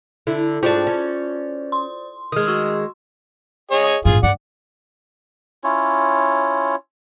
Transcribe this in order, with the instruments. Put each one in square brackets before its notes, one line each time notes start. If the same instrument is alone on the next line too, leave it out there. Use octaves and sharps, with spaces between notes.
[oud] D3 E4
[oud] G#2 D4 G4 [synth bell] F4 [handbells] C5 D5
[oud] C#4
[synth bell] C6
[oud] D#3 G#3 [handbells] D#6 F6
[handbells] F#4 E6
[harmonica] G#4 C#5 D#5
[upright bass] A1 G2 [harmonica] F4 G#4
[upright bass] G2 [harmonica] D5 F#5
[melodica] C#4 E4 F4 C#5